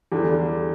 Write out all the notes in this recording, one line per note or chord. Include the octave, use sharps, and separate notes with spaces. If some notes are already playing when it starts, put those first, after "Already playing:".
E2 D3 G3 D4